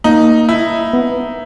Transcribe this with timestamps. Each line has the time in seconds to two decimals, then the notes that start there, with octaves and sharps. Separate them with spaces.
0.04 A#3 D#4
0.49 E4
0.93 B3